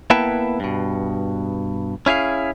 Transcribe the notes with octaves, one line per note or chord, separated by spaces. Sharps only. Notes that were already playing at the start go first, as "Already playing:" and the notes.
A#3 B3 E4 B4 G5 A5
G2 B2
C#4 E4 G#4 F5